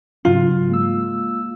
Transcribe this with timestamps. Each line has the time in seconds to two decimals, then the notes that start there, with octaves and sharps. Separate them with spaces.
0.25 G#2 C#3 F#3 F4
0.69 G#3 A#3 E6